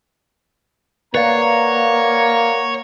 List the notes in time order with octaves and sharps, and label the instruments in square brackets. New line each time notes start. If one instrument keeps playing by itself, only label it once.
[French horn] A#3 [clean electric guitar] B4 D5 F5 [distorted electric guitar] C#5 [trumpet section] F#5 A#5